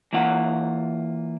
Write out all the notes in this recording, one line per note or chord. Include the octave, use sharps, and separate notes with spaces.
E3 A#3 F4 F#5